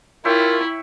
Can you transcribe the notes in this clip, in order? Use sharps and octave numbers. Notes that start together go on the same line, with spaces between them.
E4 F4 A#4 C#5 E5 G5